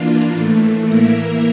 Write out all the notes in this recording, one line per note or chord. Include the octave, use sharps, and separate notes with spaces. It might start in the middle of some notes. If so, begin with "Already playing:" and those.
Already playing: E3 A#3 D4 F4
A2 E3 A3
E3 A#3 E4 A#4